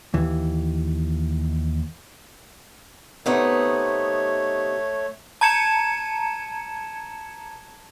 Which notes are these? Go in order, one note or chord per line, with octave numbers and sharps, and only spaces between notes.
D#2 E3
C3 A3 B3 D#4 C#5
A5 A#5 G#6 C#7 E7